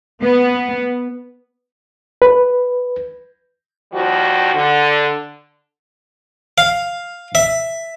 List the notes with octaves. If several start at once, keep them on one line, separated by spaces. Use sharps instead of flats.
B3
B4
D#2 F3 G3 F#4
D3
F5
E5